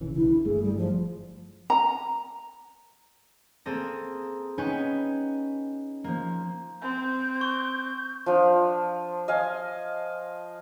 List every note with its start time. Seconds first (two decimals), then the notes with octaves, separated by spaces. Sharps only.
0.01 A#1 C#3 E3
0.16 B1 D3 E3 E4
0.30 D3
0.45 G1 G2 A3 G#4
0.63 G3
0.77 F3
1.70 A#5
3.66 A#3 C4 G#4 A4 D#6 A#6
4.58 B3 C#4 D#4 B4 G5 G#5
6.04 F3 A#3
6.82 C4 G6
7.41 C#6
8.26 F3 D4
9.28 D#5 F5 G#5